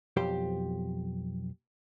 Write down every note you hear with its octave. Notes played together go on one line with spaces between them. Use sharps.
B1 F2 G4 C5